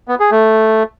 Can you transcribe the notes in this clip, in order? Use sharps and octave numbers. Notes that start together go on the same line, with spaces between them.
B3
G#4
A3